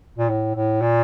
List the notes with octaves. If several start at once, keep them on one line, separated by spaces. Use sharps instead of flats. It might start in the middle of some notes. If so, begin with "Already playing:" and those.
A#2
A2
A2
A#2